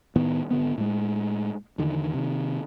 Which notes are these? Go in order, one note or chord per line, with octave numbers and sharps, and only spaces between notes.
A2 D#3 B3
G#1 D3 B3
A2 G#3
E2 D3 D#3
C3 D#3